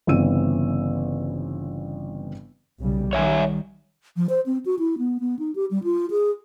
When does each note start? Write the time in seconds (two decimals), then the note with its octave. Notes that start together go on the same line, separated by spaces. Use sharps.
0.07 G1 C#3 E3 C4 E6 D#7
2.80 B1 C#3 G3
3.13 D#3 G3 C#5 E5 G#5
4.16 F3
4.29 C5
4.46 C4
4.65 F#4
4.79 E4
4.98 B3
5.20 B3
5.39 D#4
5.55 G4
5.71 G3
5.84 F4
6.10 G#4